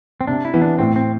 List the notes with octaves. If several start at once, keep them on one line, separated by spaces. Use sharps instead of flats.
C4
C3 D4
E4
E3 B3
D4
A2 C4
C4